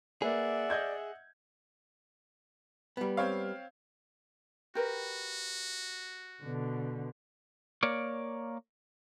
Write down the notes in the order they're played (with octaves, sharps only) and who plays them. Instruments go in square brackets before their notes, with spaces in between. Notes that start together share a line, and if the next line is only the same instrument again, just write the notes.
[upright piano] A#3 B4 [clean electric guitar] G#4 [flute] D5 [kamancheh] E5 F#5
[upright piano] D#5 G6 G#6
[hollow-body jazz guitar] G3 B3
[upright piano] C4 C#5 F5
[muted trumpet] F#4 [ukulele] G4 A#4 B4
[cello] B2 D3
[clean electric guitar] A#3 A#4 C#5 D5